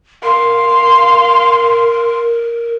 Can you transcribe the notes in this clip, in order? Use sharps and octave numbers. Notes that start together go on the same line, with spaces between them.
A#4 F5 C6